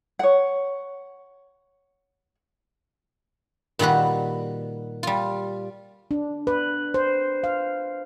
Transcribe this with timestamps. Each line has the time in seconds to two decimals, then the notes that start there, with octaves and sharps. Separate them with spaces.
0.19 C#5 F#5
3.79 A#2 D#3 G3 F#4 B4
5.03 G3 F4
6.11 D4
6.47 B4
6.94 C5
7.44 F5